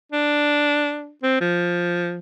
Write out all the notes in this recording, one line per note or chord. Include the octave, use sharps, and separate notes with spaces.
D4
C4
F3